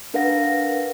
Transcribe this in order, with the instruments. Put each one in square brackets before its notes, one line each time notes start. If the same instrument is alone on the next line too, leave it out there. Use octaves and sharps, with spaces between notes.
[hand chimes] D4 A#4 B4 F5 F#5 A#6